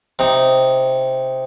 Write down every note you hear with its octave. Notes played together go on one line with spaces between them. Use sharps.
C3 D#4